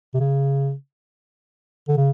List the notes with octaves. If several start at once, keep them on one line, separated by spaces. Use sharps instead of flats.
C3
C#3
D3
C#3